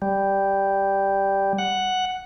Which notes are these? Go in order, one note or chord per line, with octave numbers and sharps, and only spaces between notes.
G3
F#5